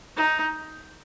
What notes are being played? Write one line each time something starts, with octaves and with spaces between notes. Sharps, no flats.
D#4